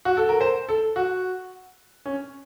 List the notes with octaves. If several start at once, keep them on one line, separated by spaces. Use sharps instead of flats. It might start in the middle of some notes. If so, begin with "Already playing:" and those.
F#4
A4
A#4
C5
A4
F#4
C#4